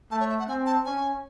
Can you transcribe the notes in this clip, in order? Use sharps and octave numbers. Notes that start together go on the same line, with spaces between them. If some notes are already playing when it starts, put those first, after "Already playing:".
A3 A5
C#5
E5
F#5
C4 G#5
A5
C#4 G#5